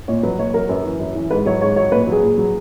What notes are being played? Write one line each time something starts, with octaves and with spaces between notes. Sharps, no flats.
A#2 C#5
F#3 B4
A#2 C#5
F#3 A#4
F#2 B4
E3
F#2
E3
G#2 B4
F#3 C#5
G#2 C#5
F#3 C#5
A#2 B4
F#3 G#4
A#2
F#3